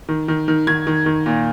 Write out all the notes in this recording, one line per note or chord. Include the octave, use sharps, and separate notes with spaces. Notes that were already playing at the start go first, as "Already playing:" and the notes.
D#3
D#3
D#3
D#3 G#6
D#3
D#3
A#2